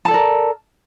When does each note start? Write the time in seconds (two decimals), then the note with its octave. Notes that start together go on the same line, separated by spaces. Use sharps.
0.05 A5
0.08 A4
0.11 D5
0.14 A#4